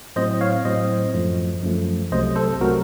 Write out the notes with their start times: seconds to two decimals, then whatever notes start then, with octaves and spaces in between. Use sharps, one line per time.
0.16 A2 F#3 C4 C5 D#5
0.41 C#5 F5
0.65 A2 F#3 C4 C5 D#5
1.14 F#2 F3 A3
1.63 F#2 F3 A3
2.11 C2 C3 F#3 A3 C5 D#5
2.36 A4 C5
2.61 C3 F#3 A3 F#4 A#4